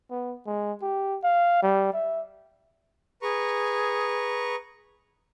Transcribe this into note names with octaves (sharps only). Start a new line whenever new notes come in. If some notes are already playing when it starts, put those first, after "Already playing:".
B3
G#3
G4
F5
G3
E5
G#4 B4 A#5 C#6